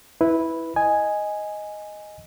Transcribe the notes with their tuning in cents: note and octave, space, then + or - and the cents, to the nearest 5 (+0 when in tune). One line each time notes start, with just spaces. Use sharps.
E4 -10 B4 +0
D#5 +0 G#5 +0